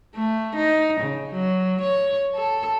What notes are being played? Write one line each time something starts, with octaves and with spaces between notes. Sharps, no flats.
A3
D#4
C#3
F#3
C#5
A4